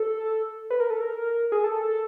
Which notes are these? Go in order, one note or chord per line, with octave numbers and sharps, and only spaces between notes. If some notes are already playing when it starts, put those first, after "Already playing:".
Already playing: A4
B4
A#4
A4
A#4
G#4
A4